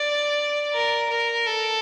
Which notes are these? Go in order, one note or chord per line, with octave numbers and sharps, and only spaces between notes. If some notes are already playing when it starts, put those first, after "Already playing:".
Already playing: D5
A#4
A#4
A4